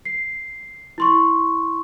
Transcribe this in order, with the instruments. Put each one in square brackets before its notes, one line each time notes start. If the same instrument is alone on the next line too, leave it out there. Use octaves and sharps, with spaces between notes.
[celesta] C7
E4 C6 C#6